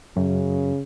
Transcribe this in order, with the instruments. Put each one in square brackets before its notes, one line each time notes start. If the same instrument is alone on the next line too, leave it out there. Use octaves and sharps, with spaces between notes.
[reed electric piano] F#2 [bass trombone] C#3